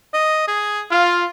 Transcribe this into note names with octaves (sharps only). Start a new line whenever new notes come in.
D#5
G#4
F4 F5